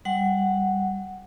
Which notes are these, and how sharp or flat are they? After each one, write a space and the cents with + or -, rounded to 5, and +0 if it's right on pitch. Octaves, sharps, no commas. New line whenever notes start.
G3 +0 F#5 +0